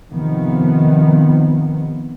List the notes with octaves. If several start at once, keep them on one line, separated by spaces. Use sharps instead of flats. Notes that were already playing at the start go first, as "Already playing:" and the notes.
C3 D#3 F3 B3